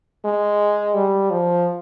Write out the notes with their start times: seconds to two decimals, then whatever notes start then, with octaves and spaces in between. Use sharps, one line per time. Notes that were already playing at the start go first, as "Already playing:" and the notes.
0.25 G#3
0.94 G3
1.30 F3